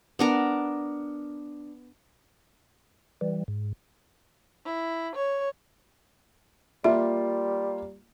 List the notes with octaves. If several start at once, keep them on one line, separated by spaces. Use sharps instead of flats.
B3 D4 A#4
E3 G3
G#2
E4
C#5
G3 A#3 F4 E5